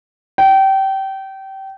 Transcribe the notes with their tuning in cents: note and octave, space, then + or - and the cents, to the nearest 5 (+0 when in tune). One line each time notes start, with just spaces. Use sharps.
G5 -25